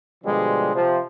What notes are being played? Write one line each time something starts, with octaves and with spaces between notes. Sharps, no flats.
B2 D3 F3 G3 G#3
C3 F3